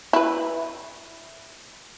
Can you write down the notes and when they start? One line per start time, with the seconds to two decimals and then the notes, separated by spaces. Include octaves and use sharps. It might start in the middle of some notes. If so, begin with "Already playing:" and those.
0.13 E4 B4